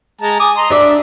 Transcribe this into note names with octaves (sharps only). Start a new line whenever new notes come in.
G#3 A5 A#5
G#5 D6 D#6
D#5 A#5 C6
D4 D5 E5